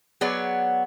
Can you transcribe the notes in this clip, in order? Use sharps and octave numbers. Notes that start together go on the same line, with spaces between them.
F#3 B3 G#4 C#5 D5